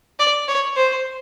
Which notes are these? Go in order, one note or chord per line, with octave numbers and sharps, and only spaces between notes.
D5
C#5
C5